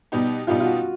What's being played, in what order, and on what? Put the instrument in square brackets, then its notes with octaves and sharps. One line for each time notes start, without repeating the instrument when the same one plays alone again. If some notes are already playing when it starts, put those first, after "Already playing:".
[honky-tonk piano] B2 G3 B3 D#4 G4
[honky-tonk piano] B2 G3 B3 D#4 G4 [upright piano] F4
[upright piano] F4
F#4